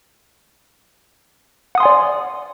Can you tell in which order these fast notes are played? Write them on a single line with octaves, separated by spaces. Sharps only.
F#5 D#6 C6 G#5 D5